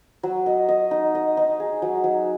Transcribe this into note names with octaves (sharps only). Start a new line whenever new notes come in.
F#3
D#5
D#5
D#4
D#5
D#4
G#4
F#3
F#3